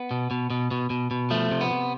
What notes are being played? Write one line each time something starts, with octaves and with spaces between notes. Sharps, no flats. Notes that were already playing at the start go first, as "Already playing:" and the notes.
Already playing: B3
B2
B2
B2
B2
B2
B2
F3 A3
C3
B3
C3